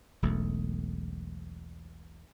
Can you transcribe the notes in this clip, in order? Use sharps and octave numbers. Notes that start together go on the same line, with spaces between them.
E1 B1 A3